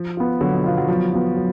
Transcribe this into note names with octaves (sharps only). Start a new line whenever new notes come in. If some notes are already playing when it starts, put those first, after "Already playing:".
Already playing: F3
B3 F4
D3 F#3
B2
B2 B3 F4
F#3
F3 F#3
B3 F4
F#3